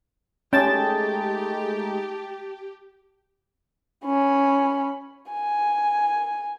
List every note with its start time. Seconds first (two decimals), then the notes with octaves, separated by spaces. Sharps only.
0.53 G#3 A3 C#4 D#4 G4 G5 A5 A6
4.05 C#4 B5
5.31 G#5